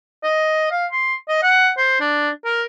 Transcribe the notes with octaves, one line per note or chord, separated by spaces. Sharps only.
D#5
F5
C6
D#5
F#5
C5
D4
A#4